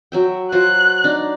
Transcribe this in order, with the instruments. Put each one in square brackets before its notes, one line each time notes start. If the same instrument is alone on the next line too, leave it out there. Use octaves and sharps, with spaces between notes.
[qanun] F#3 E5 G5
[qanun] F#3 F4 C5 [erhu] F#6
[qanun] D4 D#4